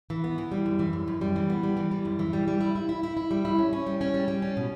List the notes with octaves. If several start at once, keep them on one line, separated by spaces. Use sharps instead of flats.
E3
B3
E3
G3
F#2
E3
F#2
F#2
G3
E3
B3
G3
E3
G3
F#2
E3
G3
G3
E4
E4
E4
E4
E4
G3
E4
C#4
C#4
G3
C#4
G3
G3
C#4
B2